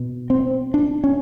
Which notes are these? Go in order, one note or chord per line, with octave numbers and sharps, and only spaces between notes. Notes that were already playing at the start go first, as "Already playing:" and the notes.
Already playing: B2
C4
D4
C#4